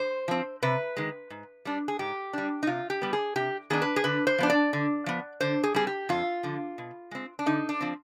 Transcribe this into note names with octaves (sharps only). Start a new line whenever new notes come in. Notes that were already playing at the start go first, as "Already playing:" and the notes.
Already playing: C5
F3 C4
C3 B4
D#3 G#3
G#2
G3 D4
G#4
G#2 G4
G3 D4
D#4
C3 F4
G4
G3 B3
G#4
C3 G4
D#3 B3 D4 G#4
B4
G#4
D3 B4
C5
F3 B3 D4
D5
D3
F3 B3
D3 C5
G#4
G3 C4 G#4
G4
F2 F4
D3 F3
B2
G#3 C4
D4
D3 D#4
D4
F3 C4